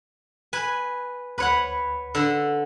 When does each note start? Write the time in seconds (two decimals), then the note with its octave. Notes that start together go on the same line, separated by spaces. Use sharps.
0.53 B4 G#5
1.38 D2 B4 C#5 F#5 B5
2.14 D3 A4